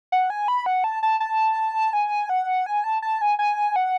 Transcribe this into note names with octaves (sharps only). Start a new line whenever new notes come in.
F#5
G#5
B5
F#5
A5
A5
A5
G#5
F#5
G#5
A5
A5
G#5
G#5
F#5